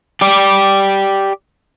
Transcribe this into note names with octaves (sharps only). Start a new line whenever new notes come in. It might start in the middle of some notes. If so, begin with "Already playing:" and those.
G4 D5